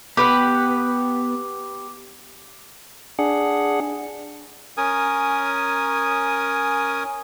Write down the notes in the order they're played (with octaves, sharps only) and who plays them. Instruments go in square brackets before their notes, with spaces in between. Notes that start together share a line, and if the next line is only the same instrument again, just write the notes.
[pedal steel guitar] B3 [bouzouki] G4 B4 F#5 [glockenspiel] D6
[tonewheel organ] D4 G#4 F#5
[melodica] C#4 A#4 G#5 D#6